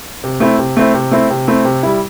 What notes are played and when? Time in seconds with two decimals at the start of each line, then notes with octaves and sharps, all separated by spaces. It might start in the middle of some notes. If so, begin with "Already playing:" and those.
0.24 C3
0.40 A3 C4 E4
0.58 C3
0.77 A3 C4 E4
0.94 C3
1.11 A3 C4 E4
1.30 C3
1.48 A3 C4 E4
1.65 C3
1.83 G3 E4